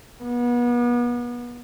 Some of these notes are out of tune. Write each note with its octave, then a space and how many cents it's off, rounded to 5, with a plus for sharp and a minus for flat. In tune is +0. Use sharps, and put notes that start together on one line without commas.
B3 -35